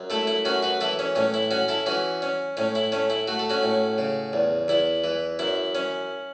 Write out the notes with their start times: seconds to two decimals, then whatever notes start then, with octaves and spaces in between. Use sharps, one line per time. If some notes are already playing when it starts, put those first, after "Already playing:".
Already playing: F#2
0.10 A3 E4 A4
0.27 E4
0.45 F#2 C#4 F#4
0.63 F#4 B4
0.81 E3 E4 A4
0.99 C#4
1.16 A2 C#4
1.34 E4
1.51 C#4 F#4
1.68 E4 A4
1.86 E3 C#4 F#4
2.22 C#4
2.57 A2 C#4
2.75 E4
2.92 A3 C#4
3.10 E4
3.28 A3 F#4
3.39 A4
3.50 C#4 F#4
3.63 A2
3.98 C#3
4.33 E2
4.68 E2 E4
5.04 E3
5.39 F#2 E4
5.75 C#4